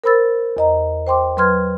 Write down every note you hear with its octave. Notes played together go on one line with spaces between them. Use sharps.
A#4 C5 B5 E6 A6
E2 D#5 A#5
C5 G5 C6 D6
F#3 B4 C6 F6 G#6